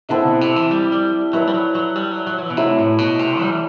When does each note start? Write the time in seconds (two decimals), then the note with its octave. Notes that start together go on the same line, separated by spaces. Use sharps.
0.09 D3 C4 E4 A4 E5
0.25 B2
0.41 C3
0.56 E3
0.71 G3
0.92 G3
1.33 F#3 E4 B4 D5
1.47 G3
1.54 F#3
1.75 F#3
1.96 G3
2.12 F#3
2.27 F#3
2.38 F#3
2.42 E3
2.50 B2
2.57 C3 F#3 A3 E4 A4
2.79 A2
2.98 B2
3.19 C3
3.41 G3
3.50 E3